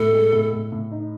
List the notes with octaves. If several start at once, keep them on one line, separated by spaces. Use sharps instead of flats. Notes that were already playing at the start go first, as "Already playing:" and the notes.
Already playing: A2 A4
G#3
A2
A2
A2
D#4